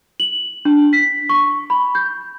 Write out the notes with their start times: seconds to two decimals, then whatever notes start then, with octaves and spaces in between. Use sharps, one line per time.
0.20 F#7
0.65 D4
0.93 B6
1.29 C#6
1.70 B5
1.95 G6